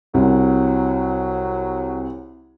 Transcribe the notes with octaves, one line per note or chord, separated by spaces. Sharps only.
C2 F#3